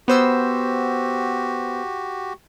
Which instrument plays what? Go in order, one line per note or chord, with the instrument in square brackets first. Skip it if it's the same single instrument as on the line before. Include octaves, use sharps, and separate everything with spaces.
[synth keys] B3 C5 E6 [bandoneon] F#4 G4